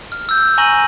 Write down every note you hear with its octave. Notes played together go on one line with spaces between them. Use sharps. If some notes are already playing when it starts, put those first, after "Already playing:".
F6
E6 G6
G#5 A#5 C#6 A#6 D#7 F#7